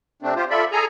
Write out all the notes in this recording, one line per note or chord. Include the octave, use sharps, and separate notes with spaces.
C3 A3 C4 D4
F4 G4 C5
F4 A4 D5 E5 B5
G#4 A4 G#5 A#5